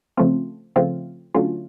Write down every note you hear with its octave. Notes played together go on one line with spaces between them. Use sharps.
C#3 F3 A3 C4 F4
C#3 F3 A3 C4 F4
D3 F#3 A3 C#4 F4